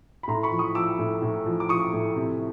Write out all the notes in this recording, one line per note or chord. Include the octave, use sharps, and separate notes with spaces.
B5
A2 A#5 C6
B5 C#6
F3
C#6 D#6
F3 D6 E6
A2
A2
F3
D6
F3 C#6 D#6
A2
C3